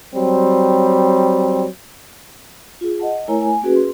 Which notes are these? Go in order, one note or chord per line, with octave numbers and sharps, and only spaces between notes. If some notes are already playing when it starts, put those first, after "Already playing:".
F#3 G3 C4
F4 G#4
D#5 F#5 A5
A3 E4 A#4 C#5 G#5 A#5
G#5
A#3 C#4 F#4 G#4 B4
C6